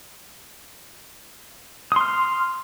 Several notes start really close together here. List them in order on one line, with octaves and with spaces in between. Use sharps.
D#6 C6 F6